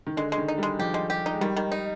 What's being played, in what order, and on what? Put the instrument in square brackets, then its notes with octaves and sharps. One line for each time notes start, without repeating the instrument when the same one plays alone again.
[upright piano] D#3
[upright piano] D3 [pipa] G#3
[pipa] G#3
[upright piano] D#3
[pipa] D#4
[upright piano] G3 [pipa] G#3
[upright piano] F3 [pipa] G4
[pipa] G#3
G4
D#4
[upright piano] G#3
[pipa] D#3 [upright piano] G3
[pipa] D#3
D#4